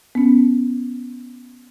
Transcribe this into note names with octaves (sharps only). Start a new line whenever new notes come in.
B3 C#4